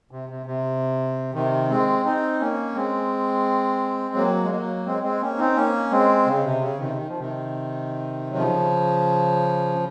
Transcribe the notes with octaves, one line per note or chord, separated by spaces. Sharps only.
C3
C3
C3
C3 D#3
G#3 C4
C4 D#4
A#3 C#4
G#3 C4
F#3 A#3
G#3
F#3 A#3
G#3 C4
G#3 C4
A#3 C#4
C4 D#4
A#3 C#4
G#3 C4
C#3
C3
C#3
C3 D#3
D#3
F3
C3 D#3
F#3
C#3 F3